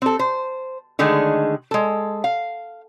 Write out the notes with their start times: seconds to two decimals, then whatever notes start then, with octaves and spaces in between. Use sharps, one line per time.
0.02 C4 A4
0.19 C5
0.99 D3 D#3 G#3 A3 G#4
1.71 G#3 A4
2.24 F5